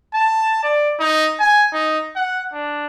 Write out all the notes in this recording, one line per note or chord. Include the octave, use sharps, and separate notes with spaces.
A5
D5
D#4
G#5
D#4
F#5
D4